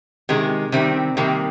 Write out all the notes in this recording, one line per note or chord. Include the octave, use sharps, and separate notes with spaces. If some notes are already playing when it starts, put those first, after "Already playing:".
C3 D#3 G#3
C3 D#3 G3 C4
C3 D#3 G3 A#3